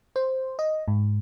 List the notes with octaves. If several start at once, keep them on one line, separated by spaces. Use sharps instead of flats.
C5
D#5
G#2